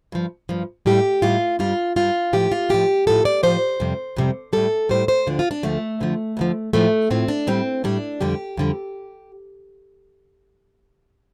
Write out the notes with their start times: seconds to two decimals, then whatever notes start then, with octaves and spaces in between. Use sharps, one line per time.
0.12 G2 F3
0.49 G2 F3
0.86 A2 G3 G4
1.22 A2 G3 F4
1.59 G2 G3 F4
1.96 G2 G3 F4
2.33 A2 F3 G4
2.52 F4
2.69 A2 F3 G4
3.07 A2 F3 A4
3.25 D5
3.43 A2 F3 C5
3.80 F2 C3 G3
4.16 F2 C3 G3
4.53 A2 G3 A4
4.89 A2 G3 C5
5.08 C5
5.27 D2 D3 F3 D4
5.39 F4
5.51 D4
5.63 D2 D3 F3 A3
6.00 F2 D3 F3
6.37 F2 D3 F3
6.73 A2 F3 A3
7.11 A2 F3 C4
7.28 D4
7.47 A2 G3 C4
7.84 A2 G3 D4
8.20 F2 D3 G3 G4
8.57 F2 D3 G3